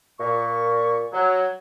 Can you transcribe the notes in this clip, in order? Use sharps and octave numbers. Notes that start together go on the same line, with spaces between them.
A#2 C#6
F#3